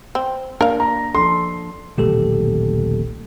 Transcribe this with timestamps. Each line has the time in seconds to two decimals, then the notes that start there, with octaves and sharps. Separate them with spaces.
0.15 C4
0.61 A#3 D4 A#4 F5
0.80 A#5
1.15 F3 D4 A4 C6
1.97 D#1 B1 D3 A3 G4 A4